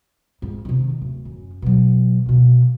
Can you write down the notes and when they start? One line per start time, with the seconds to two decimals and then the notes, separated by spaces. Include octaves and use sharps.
0.42 F2 G#2
0.65 C3 D#3
1.02 D1
1.25 F#2
1.62 B2 F#3
2.26 B2 A#3